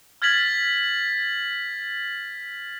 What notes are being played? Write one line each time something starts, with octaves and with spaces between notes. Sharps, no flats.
F6 G#6 A6 B6 F#7